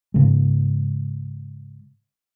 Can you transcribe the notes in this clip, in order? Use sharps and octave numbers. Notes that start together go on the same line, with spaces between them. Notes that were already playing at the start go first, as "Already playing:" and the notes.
G#2 C#3 G#3